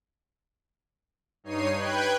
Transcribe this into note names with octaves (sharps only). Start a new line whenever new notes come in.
G2 D#4 C#5 C7 D#7
B4 G5 F#6 G#6